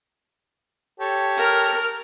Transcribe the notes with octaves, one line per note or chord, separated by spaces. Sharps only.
G4 A4 C#5
A#4 F6